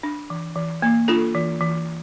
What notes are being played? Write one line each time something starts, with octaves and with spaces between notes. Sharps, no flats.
D4
E3
E3
A#3
D4 F4 A4
E3
E3